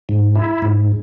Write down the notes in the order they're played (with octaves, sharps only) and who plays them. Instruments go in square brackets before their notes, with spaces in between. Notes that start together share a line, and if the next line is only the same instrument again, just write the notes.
[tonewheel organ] G#2
E4
G#2